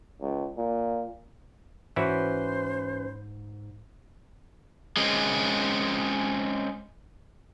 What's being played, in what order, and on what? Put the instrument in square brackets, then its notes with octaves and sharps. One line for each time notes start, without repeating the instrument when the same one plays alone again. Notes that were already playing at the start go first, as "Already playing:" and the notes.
[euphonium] C#2
A#2
[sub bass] G#2 [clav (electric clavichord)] E3 E4 F#4 [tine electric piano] C#4 B4 [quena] C5
[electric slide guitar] G#3 C4 C#4